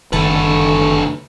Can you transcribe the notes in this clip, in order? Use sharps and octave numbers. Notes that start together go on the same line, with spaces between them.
F#1 G2 D3 D#3 A3 A4 B4